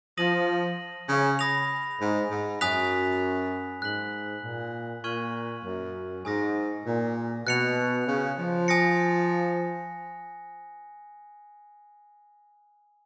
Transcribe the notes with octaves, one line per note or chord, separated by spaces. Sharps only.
F3 D#6 A#6 D#7 F#7
C#3
B5 D#6 A#6 F7
G#2
G#2
F#2 G#5 D#6 F#6 B6 F7
G#2 F#6 B6 F#7
A#2
A#2 C#6 F6 G#6 D#7 F#7
F#2
G#2 G#5 D#6 A#6
A#2
B2 F#6 C#7 F7
C#3
F3
G#5 D#6 A#6 C#7